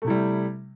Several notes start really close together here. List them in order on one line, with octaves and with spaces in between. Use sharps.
A3 C3 E4 G3